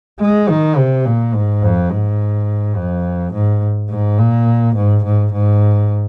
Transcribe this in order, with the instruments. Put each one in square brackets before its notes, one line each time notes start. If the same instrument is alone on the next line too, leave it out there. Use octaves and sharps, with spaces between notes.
[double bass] G#3
D#3
C3
A#2
G#2
F2
G#2
F2
G#2
G#2
A#2
G#2
G#2
G#2